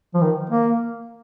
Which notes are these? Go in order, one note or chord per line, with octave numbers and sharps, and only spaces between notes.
F3
D#3
A#3